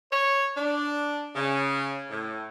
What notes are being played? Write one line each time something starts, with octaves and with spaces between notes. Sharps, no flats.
C#5
D4
C#3
A2